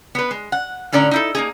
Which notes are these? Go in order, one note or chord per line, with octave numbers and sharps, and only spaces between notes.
B3 B4
G#3
F#5
A2 D3 C#4 D5 A#5
D#4 E4 A4
A#3 D#4 G#4